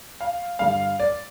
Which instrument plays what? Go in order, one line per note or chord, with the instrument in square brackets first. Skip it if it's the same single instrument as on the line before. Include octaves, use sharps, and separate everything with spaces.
[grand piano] F5
G2 D3 G3 F5
D5